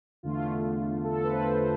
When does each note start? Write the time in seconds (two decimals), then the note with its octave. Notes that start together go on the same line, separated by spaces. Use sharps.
0.23 E2 D3 A3 F4
1.04 A4
1.24 B4
1.31 C5
1.48 C5
1.59 B4